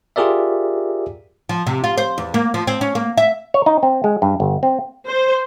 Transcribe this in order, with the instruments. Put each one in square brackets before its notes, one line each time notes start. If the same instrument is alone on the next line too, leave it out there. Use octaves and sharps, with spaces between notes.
[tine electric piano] F4 G4 G#4 A#4 D5 E5
[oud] F3
C3
F4
C5
E2
A#3
F3
C4
C#4
A#3
E5
[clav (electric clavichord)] C#5
D#4
C4
G#3
G2
G1
C4
[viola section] C5